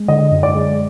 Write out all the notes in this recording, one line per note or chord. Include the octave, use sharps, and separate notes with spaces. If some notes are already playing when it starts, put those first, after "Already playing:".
Already playing: G#3
D3 D#5
F#2
D5
G#3